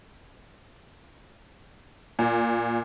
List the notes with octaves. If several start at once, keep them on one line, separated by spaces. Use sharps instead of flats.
A#2